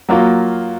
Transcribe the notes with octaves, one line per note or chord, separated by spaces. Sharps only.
F#3 A#3 F4